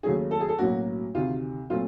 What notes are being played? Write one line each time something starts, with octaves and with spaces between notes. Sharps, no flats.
D#2 C#3 F#3 A3 C#4 G#4
A4
G#4
A4
B1 A2 F#3 A#3 C#4 F#4
D2 C3 D#3 F4
A#2 F#3 A3 C4 F4